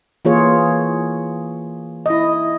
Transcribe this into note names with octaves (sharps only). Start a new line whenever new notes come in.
E3 A#3 F4 G#4 C#5
E4 D#5